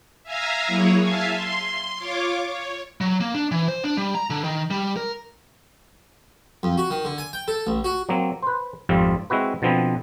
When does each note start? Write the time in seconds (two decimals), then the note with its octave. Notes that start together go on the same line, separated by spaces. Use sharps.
0.23 E5 F5 G#5 A#5
0.67 F#3 A#3 E4 G#4 C#5
1.01 E5 F5 G#5 A5
1.33 C6
1.97 F4 C#5 D6
2.45 C#5
3.01 F#3
3.21 A#3
3.35 D4
3.51 E3
3.68 C5
3.84 D4
3.97 G3
4.15 A#5
4.30 D3
4.44 D#3
4.71 G3
4.97 A#4
6.63 F2
6.78 F#4
6.90 D#3
7.05 D3
7.18 G#5
7.33 G5
7.48 A4
7.67 A1
7.84 F#4
8.09 F#3 A#3 C4
8.43 B4 C5
8.89 G#1 F2 F3 G3 C4 F4
9.30 G#3 C4 E4 F#4 B4
9.62 B2 D3 F3 B3 C4